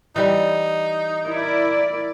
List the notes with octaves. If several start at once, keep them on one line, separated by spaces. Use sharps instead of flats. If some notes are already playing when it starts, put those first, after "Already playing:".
E3 G3 D#4
E4 A#4 D5